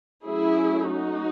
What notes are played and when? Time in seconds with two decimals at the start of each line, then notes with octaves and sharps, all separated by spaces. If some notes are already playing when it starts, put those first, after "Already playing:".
0.24 F#3 A3 C#4 E4 G#4
0.89 D#4 F#4